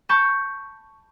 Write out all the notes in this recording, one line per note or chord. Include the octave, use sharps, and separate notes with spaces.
A5 B5 C#6 G6